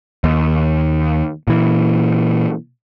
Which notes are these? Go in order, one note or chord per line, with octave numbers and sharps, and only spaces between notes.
D#2
A#2 E3